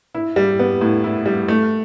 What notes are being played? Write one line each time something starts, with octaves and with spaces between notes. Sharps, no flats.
E4
G3
B3
A2
E4
G3
A3